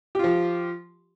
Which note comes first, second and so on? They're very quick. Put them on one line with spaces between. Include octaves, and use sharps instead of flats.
G4 F4 F3